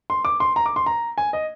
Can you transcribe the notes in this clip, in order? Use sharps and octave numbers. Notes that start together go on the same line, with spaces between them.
C6
D6
C6
A#5
D6
C6
A#5
G#5
D#5